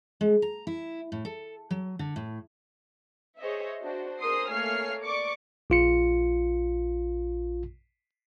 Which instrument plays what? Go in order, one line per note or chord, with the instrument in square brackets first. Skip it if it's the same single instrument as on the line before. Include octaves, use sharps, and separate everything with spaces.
[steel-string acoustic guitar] G#3
A#5
E4
A2
A4
F#3
D3
A2
[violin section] G#4 C5 C#5 D#5 E5
D4 F#4 C5
G#4 A#4 C5 C6 D#6 C7
A3 A#3 C#5 G#5 F6 C7
D5 C#6 D6 C#7
[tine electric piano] A#1 F4 C#7